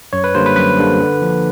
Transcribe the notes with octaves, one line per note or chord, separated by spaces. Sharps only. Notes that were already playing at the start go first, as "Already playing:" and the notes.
F#2 C#5
B4
D3 G3 A#3 D4 C5
B4
F#2 B4
D3 G3 A#3 D4
D3
F3 A#3 D4